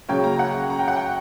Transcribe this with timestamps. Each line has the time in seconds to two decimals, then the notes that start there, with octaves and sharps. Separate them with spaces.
0.09 C#3 F#3 A#3 C#4 G5
0.24 A#5
0.39 F#5
0.70 A#5
0.79 G5
0.88 F#5
0.96 G5